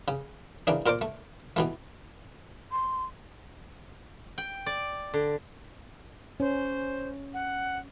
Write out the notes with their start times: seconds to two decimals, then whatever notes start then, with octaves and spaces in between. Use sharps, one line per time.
0.08 C#3
0.67 C#3 E3 A#3 D4
0.86 A#2 A#4 C5 D5 D6
1.01 A3
1.56 B2 E3 A3
2.72 C6
4.38 G5
4.66 D5
5.14 D3
6.40 C#4 C5
7.34 F#5